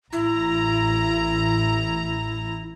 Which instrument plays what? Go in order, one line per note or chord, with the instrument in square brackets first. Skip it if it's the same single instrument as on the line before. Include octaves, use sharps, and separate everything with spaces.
[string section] A1 A#5 [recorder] E4